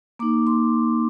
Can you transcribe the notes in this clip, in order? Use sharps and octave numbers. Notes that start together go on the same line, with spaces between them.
A#3 D#4 D6
C6